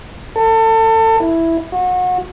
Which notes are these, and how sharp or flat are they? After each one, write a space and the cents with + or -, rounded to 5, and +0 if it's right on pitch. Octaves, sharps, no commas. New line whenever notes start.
A4 +30
E4 +0
F#4 -30